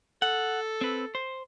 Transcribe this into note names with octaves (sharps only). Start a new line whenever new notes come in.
A4 F#5
C4 B4
C5